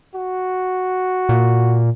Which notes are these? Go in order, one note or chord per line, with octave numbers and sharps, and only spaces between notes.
F#4
A#2